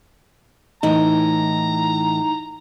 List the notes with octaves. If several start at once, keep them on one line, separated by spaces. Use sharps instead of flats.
A2 E3 D#4 A#5